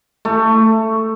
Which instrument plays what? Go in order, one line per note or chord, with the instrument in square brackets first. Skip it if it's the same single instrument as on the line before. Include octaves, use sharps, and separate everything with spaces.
[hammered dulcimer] A3